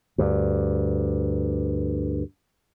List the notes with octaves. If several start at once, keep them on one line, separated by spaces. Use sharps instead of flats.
D2 G2